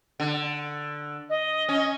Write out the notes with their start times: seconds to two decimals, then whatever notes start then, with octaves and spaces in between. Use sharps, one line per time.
0.20 D3
1.30 D#5
1.68 C#4